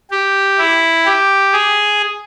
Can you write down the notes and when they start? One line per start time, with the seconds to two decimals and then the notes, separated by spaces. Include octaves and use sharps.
0.11 G4
0.58 E4
1.06 G4
1.52 G#4